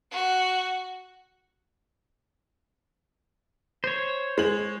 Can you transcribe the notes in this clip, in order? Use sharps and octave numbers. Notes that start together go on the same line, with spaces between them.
F#4
C5 C#5
G#3 F#7